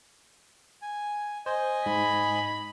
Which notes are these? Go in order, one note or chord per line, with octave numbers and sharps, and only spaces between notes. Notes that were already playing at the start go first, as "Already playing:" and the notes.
G#5
C5 D#5 G#5
G#2 B5